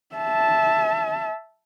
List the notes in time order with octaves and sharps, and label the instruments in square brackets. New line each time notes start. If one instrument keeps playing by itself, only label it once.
[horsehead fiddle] E5 A5